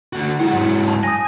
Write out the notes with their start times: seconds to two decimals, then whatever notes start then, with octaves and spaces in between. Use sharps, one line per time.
0.13 D3 F#4
0.40 G#3 E4 F#5
0.51 G#2 F#3
0.88 A5
1.03 G#5 D#6 A#6